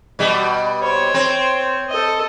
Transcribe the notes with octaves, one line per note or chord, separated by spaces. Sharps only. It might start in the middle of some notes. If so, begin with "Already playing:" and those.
B2 G3
C5 C#5
C4
A4 D#5